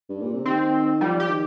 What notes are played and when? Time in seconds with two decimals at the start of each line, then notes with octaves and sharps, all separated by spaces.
0.09 G2
0.21 A#2
0.34 C3
0.45 D#3 C4
1.01 F3 G3
1.20 G4
1.28 D#3